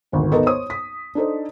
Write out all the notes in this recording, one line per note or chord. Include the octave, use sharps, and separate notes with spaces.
D#1 G#1 D2
B3 D#4 A4 A#4 D#5
C5 C#5 D#6
B6
D4 D#4 A4 C5